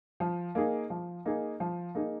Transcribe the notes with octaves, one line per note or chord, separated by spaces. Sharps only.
F3
A#3 D#4 G#4
F3
A#3 D#4 G#4
F3
A#3 D#4 G#4